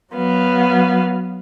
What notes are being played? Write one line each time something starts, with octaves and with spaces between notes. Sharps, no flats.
F#3 B3 F5